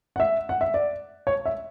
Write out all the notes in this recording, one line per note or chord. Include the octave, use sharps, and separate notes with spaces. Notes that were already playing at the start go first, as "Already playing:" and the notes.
F#5
E5
F#5
E5
D5
C#5
E5